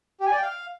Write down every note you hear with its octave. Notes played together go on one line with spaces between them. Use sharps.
G4
G#5
D5
G5
F5